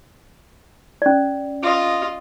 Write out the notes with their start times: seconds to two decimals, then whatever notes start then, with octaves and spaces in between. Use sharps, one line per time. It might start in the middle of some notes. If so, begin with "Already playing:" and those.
1.02 C#4 D5
1.63 F4 D#5